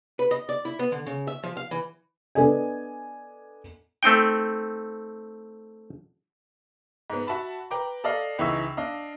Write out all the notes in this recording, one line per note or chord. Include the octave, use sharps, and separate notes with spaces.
B4
D#5
D5
E4
B3
D3
C#3
E5
F3
F5
E3
B3 D4 A4 D5 D#5 G#5
A3 C4 D#4 G5
G#2 B3
F#4 E5 A5 B5
B4 G5 A#5 D6
A4 D5 D#5 F5
C#2 E3 D#4 E5 C#6 E6
D4 D#5 F5